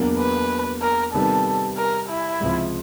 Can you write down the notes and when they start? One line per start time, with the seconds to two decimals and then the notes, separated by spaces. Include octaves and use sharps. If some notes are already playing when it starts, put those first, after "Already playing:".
Already playing: E2 B2 F#3 A#3 D4
0.19 B4
0.82 A#4
1.13 C3 D#3 G3 B3 A4
1.77 A#4
2.09 E4
2.40 C#2 C3 F3